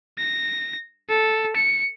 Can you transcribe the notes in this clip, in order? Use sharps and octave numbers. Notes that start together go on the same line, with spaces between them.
A#6
A4
C#7